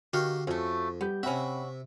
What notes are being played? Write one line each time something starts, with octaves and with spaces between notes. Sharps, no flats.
D3 D#3 F#4 G4 F5
F2 C#3 A3 F#4
G3 B3 G4 G6
C3 C4 C#4 F#4 E5 G5 B5